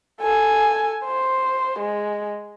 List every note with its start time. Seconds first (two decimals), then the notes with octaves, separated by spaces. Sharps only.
0.21 A4 G#5
1.05 C5
1.79 G#3